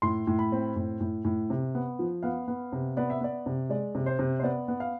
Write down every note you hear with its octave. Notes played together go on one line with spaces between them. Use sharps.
A2 C6
A2
B5
C4
A2
A2
A2
C3
B3
F3
B3 F5
B3
C3
B3 D5
E5
B3 D5
C3
G#3 D5
C3
C5
C3
C5
B3 D5
B3
F5